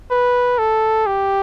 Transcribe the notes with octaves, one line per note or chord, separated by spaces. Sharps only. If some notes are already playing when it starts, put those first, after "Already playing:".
B4
A4
G4